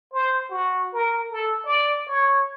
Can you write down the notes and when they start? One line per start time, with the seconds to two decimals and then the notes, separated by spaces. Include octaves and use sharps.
0.13 C5
0.51 F#4
0.93 A#4
1.32 A4
1.65 D5
2.07 C#5